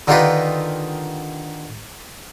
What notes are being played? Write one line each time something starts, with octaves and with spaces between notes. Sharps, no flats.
D3 D#3 D#4 F4 G4 B4